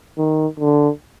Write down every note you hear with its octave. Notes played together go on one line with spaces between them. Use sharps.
D#3
D3